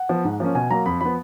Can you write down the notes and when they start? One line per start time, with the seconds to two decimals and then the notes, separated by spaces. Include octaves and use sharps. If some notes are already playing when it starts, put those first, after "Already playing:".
Already playing: F#5
0.09 F3 B3
0.25 G#2
0.40 F3 A#3 C#4
0.55 B2 G#5
0.70 F#3 A#3 A#5
0.86 F2 B5
1.01 F3 B3 B5